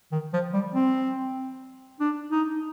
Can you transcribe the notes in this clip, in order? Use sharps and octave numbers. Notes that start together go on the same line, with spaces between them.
D#3
F3
G3
C4
D4
D#4